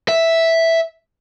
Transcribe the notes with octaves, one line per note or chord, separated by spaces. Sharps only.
E5